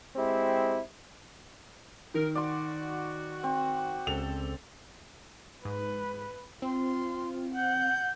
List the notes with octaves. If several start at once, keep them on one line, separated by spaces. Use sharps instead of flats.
G#3 C4 E4 G4
D#3 A#4
F#4 D5 C6
C4
C#2 C#3 C4 A4 F7
G#2 B4
C4 F4 C6
F#5 G6